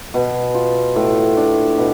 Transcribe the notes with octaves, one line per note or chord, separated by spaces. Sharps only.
B2
F4
A2
D4
B2